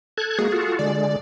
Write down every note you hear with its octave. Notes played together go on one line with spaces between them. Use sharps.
A4 F#6 G#6
G#3 A#3 F#4 G#4
F4 F#4 A4
D3 G#3 D5